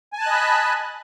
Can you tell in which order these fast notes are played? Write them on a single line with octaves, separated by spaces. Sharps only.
G#5 A5 F#6 D#5 B5